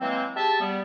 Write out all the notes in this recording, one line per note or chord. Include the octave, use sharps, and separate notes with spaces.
E3 F#3 G#3 A#3 C4
G4 G#4 E5 A5
G3 B3